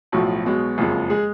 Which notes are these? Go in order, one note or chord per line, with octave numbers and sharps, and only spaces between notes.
B1 A2 F3 F#4
B1 B2 G#3
F#1 F2 F3 G#3
G#3 G#4